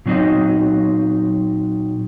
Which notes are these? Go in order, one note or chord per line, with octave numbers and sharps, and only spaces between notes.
A#2 F#3 C4 D#4 D#5